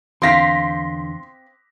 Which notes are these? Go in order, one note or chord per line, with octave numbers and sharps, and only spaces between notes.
E2 D3 C4 F5 C6 A#6 B6